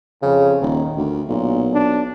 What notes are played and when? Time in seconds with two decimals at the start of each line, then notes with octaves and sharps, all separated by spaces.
0.22 F2 C#3
0.61 D#1 D#3
0.97 D2
1.29 B1 A#2
1.73 D4